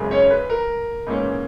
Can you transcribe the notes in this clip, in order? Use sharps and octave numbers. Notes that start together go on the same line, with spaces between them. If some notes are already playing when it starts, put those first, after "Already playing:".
Already playing: G#1 F#2 C#3 G#3
C#4 C#5
B4
A#4
G#2 E3 A#3 C#4